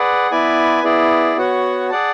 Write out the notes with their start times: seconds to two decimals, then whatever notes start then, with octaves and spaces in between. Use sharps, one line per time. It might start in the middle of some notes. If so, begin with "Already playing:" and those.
Already playing: G#4 B4 D5 F#5
0.31 B3 E4 B4 D5 G#5
0.84 B3 E4 G#4 D5
1.37 B3 F#4 C#5 F#5
1.90 G#4 D5 F#5 A5